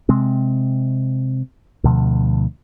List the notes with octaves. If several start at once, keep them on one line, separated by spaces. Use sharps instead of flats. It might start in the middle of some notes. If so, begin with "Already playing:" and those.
C3 G#3 C4
D2 B2 F3